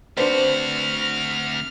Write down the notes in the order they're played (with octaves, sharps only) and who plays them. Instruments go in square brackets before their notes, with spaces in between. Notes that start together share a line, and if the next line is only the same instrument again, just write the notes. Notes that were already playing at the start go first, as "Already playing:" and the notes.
[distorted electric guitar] D2 F#4 [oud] C4 [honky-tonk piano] D4 B4 C5 [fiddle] F6